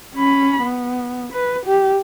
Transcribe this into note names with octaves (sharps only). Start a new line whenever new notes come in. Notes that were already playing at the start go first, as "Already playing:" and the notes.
C#4 B5
B3
B4
G4